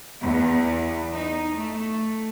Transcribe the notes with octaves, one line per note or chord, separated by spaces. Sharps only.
E2
D#4
A3